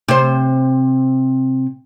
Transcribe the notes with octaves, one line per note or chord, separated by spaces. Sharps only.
C3 C5